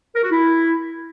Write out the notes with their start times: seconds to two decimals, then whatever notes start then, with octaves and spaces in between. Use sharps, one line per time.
0.15 A#4
0.23 F#4
0.32 E4